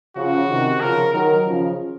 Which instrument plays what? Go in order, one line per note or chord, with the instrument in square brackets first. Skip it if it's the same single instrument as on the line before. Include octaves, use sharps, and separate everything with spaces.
[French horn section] C#3 F3 [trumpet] F#4
[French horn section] C3 D#3
[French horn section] C#3 F3 [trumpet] A#4
[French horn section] D#3 F#3 [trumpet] A#4
[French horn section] C#3 F3